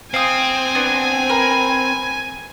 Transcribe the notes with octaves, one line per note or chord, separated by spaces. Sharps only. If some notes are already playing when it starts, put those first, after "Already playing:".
C4 F5 G5 G#5 D#6
B3 D4 C5
A#4 B4